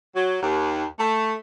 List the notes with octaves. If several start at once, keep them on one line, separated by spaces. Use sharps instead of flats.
F#3
D#2
A3